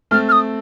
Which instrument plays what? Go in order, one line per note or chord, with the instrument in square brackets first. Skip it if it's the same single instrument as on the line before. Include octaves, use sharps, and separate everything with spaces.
[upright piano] A3 C4 [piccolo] F6
[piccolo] F6
D#6